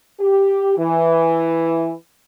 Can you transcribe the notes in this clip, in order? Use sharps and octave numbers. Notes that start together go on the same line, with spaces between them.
G4
E3